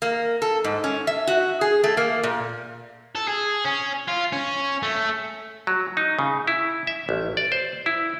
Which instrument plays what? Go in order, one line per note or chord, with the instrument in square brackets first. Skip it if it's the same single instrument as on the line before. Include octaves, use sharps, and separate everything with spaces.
[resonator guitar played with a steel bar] A#3
A4
G#2
C#4
E5
F#4
G#4
A3
A#3
A#2
[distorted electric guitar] A4
G#4
C#4
F4
C#4
A3
[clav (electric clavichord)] F#3
D#4
C#3
E4
E5
A1
D5
C5
E4